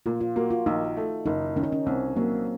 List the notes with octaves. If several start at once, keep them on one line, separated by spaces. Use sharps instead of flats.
A#2 F4
F4
A#3 F#4
F4
A#1 D#4
A3
F#1 D#4
D#3 C#4
D#4
C#4
C2 C4
F#3 A#3